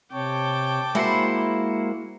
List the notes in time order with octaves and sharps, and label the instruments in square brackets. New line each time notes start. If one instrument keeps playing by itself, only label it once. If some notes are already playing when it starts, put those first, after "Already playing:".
[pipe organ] C3 C#5 [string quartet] G5 A5 D6
[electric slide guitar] G#3 F#4 C5 [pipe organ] A#3 [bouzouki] E4